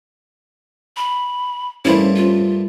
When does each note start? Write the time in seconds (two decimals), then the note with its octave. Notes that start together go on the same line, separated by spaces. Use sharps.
0.97 B5
1.85 G2 A3 A#3 C#4 E4 C5
2.16 F4